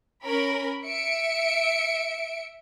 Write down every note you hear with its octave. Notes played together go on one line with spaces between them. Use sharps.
C#4 A#4 B5
E5 C#7 D7